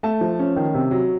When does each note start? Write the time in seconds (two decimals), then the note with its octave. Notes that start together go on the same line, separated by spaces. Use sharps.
0.03 A3 A5
0.21 F3
0.39 C#4
0.56 D#3
0.74 C3
0.91 F#3